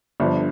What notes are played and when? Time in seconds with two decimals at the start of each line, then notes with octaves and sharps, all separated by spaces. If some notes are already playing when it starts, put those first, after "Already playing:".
0.20 G1 G2 D3 F3